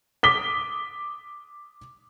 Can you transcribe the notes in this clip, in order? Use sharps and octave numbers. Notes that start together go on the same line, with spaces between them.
D6 D#6 B6 G7